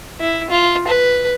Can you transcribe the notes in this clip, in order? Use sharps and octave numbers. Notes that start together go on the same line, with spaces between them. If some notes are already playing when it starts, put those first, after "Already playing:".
E4
F4
B4